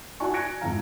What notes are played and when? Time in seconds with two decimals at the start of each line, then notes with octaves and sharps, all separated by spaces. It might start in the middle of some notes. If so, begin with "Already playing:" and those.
0.20 E4 F#4 D5 G#5 C#6
0.33 G#5 F#6 G#6 A#6 C#7 D7
0.61 F2 G#2 E4 F5 A#5